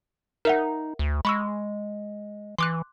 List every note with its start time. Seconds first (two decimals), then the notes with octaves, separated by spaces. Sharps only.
0.45 D#4 A#4 E5 F#5
0.99 D2
1.25 G#3 B5 C#6 E6
2.58 E3 C6 D6 F#6